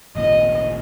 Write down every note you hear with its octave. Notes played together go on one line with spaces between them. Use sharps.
G#1 C#2 A#2 D#5